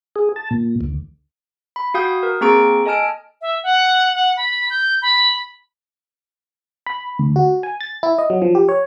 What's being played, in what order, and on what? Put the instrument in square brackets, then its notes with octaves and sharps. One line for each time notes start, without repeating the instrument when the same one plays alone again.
[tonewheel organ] G#4
A5
A#2
D2
[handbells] B5
F#4 F5 G5 D#6 G6
A#4
A#3 C4 G#4 A#5 C#6 D7
A4 D#5 G#5 A5 F6 D7
[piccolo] E5
F#5
F#5
B5
G6
B5
[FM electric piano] B5
D2
F#4
G#5
A6
E4
D#5
F#3
F3
G4
C#5